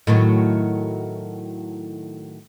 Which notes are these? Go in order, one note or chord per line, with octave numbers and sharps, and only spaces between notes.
A2 D#3 F#3